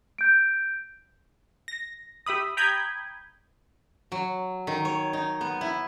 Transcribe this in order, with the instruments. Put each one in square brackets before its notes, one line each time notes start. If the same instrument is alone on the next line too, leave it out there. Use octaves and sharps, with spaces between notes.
[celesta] G6 D7
[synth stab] A#6
G4 E5 B5 D#6
G5 A#5 B5 D#6 G6 G#6
[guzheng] F#3
D#3
C#5
D#4
B3
E4